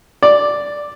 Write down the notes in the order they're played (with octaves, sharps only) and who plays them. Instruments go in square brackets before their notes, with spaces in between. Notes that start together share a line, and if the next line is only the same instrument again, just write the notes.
[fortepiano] D5